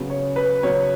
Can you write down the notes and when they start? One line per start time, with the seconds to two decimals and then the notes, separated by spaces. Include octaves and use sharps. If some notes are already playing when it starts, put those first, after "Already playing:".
Already playing: C#3 F#3 B3
0.10 C#5
0.36 B4
0.63 C#3 F#3 B3 C#5